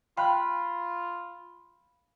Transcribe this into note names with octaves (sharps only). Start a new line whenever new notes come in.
F4 F5 G5 B5 F#6